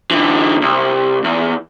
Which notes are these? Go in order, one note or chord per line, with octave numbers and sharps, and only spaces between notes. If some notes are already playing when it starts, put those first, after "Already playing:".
D3 E3
C2
E2